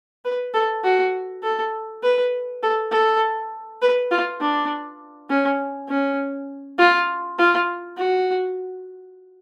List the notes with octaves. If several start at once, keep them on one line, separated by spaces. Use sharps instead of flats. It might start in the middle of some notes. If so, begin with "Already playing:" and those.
B4
A4
F#4
A4
B4
A4
A4
B4
F4
D4
C#4
C#4
F4
F4
F#4